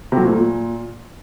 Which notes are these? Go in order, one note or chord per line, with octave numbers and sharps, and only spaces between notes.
C3
F#3
A#2
A3
A#2